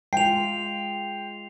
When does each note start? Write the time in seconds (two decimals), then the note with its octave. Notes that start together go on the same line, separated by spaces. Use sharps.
0.13 G#3 F4 G5 C7 F7